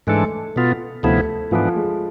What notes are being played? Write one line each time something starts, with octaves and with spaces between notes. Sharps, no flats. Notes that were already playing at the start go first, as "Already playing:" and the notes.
G#2 E3 G#3 A3 D4 A4
B2 B3 F4
D2 C3 F3 A3 B3 E4
G#2 E3 F3 B3 D4
G#3